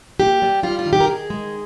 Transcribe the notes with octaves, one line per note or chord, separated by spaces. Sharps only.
A#3 G4
G3
G3 F4
F4
D#3
G4
A#4
D#3 G#4
G#3